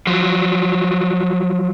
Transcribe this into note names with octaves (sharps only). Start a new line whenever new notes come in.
F3 F#3